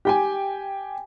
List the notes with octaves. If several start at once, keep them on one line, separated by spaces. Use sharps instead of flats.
G4 G5 G#5